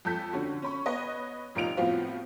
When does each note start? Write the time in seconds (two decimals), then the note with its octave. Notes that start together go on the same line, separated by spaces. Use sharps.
0.05 F2 A4 G6 B6
0.33 D3 C#4 F#4
0.62 C#4 B5 C#6
0.86 B3 B4 C#5 D#5
1.55 F1 A#2 A#3 D#4 D7 F7
1.77 A2 F3 B3 C4 F4 F#4